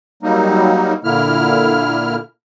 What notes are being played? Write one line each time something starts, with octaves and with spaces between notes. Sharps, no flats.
F#3 G3 A#3 D#4
A#2 D3 A#3 E4 F6